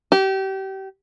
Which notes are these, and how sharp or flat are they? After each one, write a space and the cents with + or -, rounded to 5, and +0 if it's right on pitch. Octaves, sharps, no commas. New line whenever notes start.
G4 -30